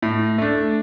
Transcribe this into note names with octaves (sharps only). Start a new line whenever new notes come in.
A2
A3 D4